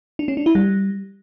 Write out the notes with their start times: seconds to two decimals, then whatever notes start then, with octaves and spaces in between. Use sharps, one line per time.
0.19 D4
0.28 C#4
0.37 D4
0.46 E4
0.55 G3